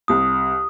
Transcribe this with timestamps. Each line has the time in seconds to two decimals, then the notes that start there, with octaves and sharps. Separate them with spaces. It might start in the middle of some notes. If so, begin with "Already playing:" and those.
0.08 C2 D#6